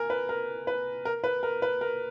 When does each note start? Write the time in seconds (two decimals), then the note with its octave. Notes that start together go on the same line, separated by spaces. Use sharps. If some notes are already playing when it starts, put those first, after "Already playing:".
Already playing: A#4 G#5
0.10 B4
0.29 A#4
0.67 B4
1.05 A#4
1.24 B4
1.43 A#4
1.62 B4
1.81 A#4